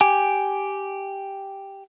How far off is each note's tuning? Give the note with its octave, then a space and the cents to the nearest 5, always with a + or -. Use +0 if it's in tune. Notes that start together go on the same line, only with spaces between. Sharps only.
G4 +0 G#5 +0